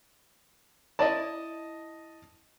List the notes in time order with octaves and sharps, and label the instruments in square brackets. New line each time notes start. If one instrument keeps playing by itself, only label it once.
[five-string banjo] E4 D5 B5 [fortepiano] D#5 A5